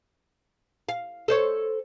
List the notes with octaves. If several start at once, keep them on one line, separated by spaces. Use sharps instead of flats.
F5
A4 C5 C#5